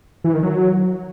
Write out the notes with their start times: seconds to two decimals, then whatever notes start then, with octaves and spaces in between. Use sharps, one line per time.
0.24 E3
0.34 D#3
0.43 F#3